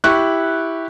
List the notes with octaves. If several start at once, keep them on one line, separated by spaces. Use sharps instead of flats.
E4 G4 C#6 F#6